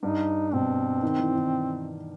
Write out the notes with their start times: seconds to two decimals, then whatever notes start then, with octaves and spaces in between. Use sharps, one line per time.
0.03 G2 D#4
0.53 B2 C4
1.03 D#3
1.19 E3
1.36 D#3